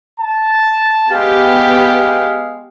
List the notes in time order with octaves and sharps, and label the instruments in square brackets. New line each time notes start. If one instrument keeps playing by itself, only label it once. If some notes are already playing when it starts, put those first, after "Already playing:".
[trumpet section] A5
[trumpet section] G#3 F5 [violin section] B3 G4